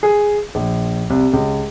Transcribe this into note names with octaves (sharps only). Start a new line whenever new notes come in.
G#4
A#1
C2
C#2